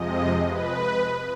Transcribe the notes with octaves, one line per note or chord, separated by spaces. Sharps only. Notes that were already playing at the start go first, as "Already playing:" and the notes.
Already playing: F2 C3 F3 G#3 D#5
B4